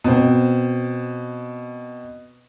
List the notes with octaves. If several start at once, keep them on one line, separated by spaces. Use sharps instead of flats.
B2 C4